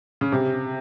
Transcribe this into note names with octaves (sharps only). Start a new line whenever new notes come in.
C#3
C3